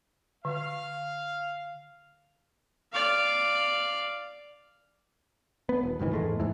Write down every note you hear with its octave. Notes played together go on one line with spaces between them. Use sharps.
D3 F5
D5 F5
B3
D#1
F#1 G#2 D#3 E3
E2 G#2 G#3 A3
D#2 G#2 E3